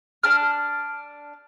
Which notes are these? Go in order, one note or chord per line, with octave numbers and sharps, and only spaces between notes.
D4 A5 F6